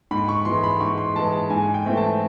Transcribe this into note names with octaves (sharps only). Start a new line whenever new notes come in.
G#2 B5
C#6
E3 G#3 C6
B5
G#2 C#6
C6
E3 G#3 A5
A5
G#2 G#5
G5
E3 A3 C4
A5